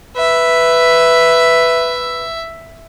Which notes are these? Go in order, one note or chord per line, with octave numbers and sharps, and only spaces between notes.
B4 E5